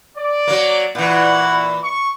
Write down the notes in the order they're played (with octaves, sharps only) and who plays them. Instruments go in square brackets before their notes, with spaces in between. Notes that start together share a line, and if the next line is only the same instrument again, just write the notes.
[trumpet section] D5
[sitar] F#3 A#3
[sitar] A#2 E3 [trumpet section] E4 F#4 F#5
[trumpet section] C#6